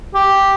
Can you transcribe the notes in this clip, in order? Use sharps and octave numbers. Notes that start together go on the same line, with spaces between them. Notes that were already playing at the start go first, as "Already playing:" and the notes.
G4